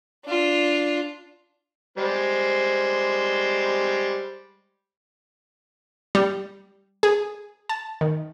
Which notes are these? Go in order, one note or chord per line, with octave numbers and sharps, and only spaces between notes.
D4 F4
G3 G#3 C5
G3
G#4
A5
D#3